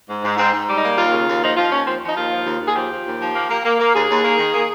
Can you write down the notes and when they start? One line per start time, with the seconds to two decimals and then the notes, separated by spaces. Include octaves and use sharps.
0.09 G#2
0.24 G#2
0.38 G#2 C4
0.53 G#2
0.67 G3
0.78 D#4
0.83 A#3
0.97 D#2 F4
1.12 C#3
1.27 D#2
1.42 F3 D#4
1.57 F3 F4
1.71 D#2 C#4
1.86 F3 C4
2.02 F3
2.08 D#4
2.16 D#2 F4
2.31 F3
2.46 D#2
2.61 D#2
2.68 G#4
2.75 F3 G4
2.90 F3
3.05 D#2
3.20 F3
3.34 A#3
3.50 A#3
3.65 A#3
3.79 A#3
3.94 D#2 G#4
4.09 D#2
4.23 A#3
4.38 D#3
4.53 A#3